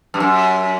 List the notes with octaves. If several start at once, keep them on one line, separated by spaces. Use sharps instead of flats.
G2
F#2